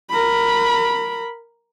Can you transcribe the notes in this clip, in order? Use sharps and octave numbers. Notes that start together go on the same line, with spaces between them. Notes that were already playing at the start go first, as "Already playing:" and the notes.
A#4 B5